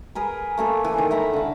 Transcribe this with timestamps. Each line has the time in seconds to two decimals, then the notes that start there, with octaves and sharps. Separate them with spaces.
0.15 G#4 A#4 B4
0.57 A3 A#3 A4 C#5
0.85 E3
0.98 D#3
1.11 E5 F#5 A#5 B5
1.33 D3 F5